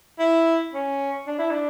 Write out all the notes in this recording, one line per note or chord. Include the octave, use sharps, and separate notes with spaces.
E4
C#4
D4
E4
D4